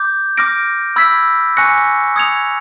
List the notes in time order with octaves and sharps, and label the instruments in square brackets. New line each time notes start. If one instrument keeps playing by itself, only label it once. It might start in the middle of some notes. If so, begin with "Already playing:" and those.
Already playing: [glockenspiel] D6 G6
D6 F6 A#6 D7
B5 E6 G#6 B6
G#5 C#6 F#6 A#6 C#7
D#6 G#6 C#7 F7